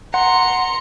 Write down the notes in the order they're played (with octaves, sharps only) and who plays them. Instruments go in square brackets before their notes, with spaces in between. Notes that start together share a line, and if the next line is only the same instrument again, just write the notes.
[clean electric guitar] F#5 [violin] A#5 C#7 [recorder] C6